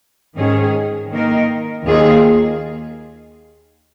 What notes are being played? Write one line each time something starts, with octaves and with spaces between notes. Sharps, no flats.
G#2 D#3 C#4 G#4
D#3 A#3 D#4 A#4
D#2 D#3 A#3 F4 G#4